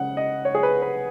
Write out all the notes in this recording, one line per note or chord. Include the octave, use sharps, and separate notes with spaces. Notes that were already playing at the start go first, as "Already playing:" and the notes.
Already playing: C#3 G#3 F#5
D#5
C#5
G#4
B4
B4